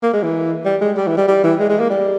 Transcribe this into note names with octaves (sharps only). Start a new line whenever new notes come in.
A#3
G#3
E3
G3
G#3
G3
E3
G3
G3
E3
G#3
G#3
A#3
G3